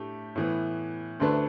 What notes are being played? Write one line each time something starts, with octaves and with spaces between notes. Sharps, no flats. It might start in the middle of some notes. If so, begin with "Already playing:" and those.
Already playing: A2 A3 D4 G4
A2 E3 B3
D2 D3 A3 D4 B4